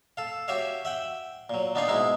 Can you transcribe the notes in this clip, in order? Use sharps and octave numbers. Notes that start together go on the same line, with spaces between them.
A4 F5
F#4 G4 C#5 E5 F5
E5 F#5 G5
A#2 F#3
B3 D4 D#4 F4 F5 G#5
G#2 B2 G#3 D#4 E4 G#4